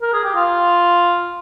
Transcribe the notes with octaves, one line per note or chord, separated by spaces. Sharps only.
A#4
G#4
G4
F4